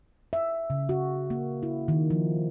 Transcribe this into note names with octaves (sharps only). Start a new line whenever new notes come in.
E5
C#3
F#4
A#3
E4
D#3
F3